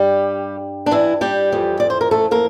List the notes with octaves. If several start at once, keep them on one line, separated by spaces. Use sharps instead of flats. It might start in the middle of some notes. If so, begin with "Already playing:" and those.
Already playing: G2 G3 G4
D4
E3 E4
G3 G4
F2 E3
D5
C5
A#4
A3 A4
A#3 A#4